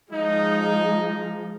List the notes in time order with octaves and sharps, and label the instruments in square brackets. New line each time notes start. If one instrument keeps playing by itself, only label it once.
[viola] F3 G#3 [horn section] D#4